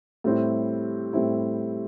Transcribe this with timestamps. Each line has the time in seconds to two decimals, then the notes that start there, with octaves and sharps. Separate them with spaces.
0.24 A2 G3 C4 E4
1.13 A2 G3 C4 E4